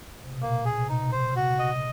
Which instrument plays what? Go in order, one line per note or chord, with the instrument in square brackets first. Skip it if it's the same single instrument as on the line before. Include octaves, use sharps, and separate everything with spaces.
[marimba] C3
B2
[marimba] A#2 [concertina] A#3
[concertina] G#4
[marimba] C3
[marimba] B2 [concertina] D#4
[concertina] C5
[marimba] C#3
[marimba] C3 [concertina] F#4
[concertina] D#5